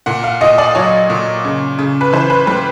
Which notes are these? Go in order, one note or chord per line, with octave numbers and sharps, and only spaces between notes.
A#2 F#5
F5
A#2 D#5
D5
F#3 C#5
A#2
C#3
C#3
B4
E3 C5
B4
G3 B4